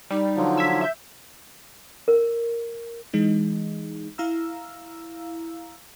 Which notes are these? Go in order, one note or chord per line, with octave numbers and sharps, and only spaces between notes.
G3 D#4
D3 F3 F#3
E6 G#6 B6
E5 G6
A#4
E3 G#3 D#4
E4 F5 A#5 E6